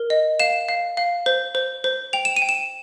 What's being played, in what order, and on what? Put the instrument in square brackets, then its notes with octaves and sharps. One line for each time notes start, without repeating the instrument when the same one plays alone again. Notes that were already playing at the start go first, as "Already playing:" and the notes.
Already playing: [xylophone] A#4
D#5
F5 E7
F5
F5
C5
C5
C5
G5 F7
E7
D#7
G5
E7